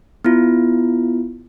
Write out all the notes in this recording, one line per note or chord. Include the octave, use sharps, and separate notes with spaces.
B3 E4 F4